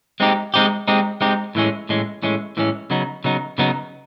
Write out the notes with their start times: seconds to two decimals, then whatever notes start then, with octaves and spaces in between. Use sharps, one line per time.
0.20 G#3 C4 D#4 G4
0.54 G#3 C4 D#4 G4
0.88 G#3 C4 D#4 G4
1.21 G#3 C4 D#4 G4
1.55 A2 E3 G#3 C#4
1.89 A2 E3 G#3 C#4
2.23 A2 E3 G#3 C#4
2.57 A2 E3 G#3 C#4
2.90 C#3 F#3 B3 D#4
3.24 C#3 F#3 B3 D#4
3.58 C#3 F#3 B3 D#4